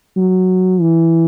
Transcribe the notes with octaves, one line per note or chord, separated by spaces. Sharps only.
F#3
E3